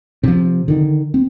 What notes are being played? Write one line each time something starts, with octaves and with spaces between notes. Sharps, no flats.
C3 F3
D3 D#3
C4